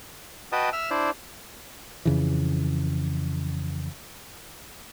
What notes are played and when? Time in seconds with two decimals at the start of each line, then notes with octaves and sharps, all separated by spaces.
0.52 F#4 B4 D#5 G5 A5 D#6
0.73 E5 E6 F6
0.91 D4 E4 C5 D5
2.05 F2 C#3 E3